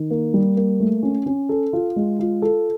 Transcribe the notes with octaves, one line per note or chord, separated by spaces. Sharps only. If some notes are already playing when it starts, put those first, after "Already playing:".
Already playing: D#3
A#3
G3
A#3
A3
C#4
C#4
A4
F4
G#3
F4
A4